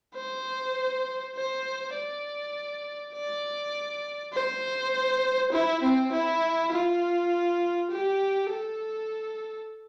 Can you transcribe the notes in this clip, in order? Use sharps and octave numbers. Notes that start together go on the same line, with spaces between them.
C5
C5
D5
D5
C5
E4
C4
E4
F4
G4
A4